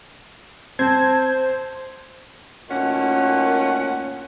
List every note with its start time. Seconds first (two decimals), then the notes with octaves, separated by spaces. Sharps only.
0.79 C4 C5 A5 G#6
2.69 D2 A#2 D#3 A#3 C#4 F#5